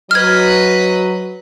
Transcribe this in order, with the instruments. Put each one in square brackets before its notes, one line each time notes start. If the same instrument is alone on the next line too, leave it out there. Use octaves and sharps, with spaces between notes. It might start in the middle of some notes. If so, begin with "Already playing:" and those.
[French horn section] F#3 [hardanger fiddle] B4 D#5 [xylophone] F6 G#6